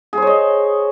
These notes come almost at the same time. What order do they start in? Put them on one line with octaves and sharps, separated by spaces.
G#4 C5 C#5 D#5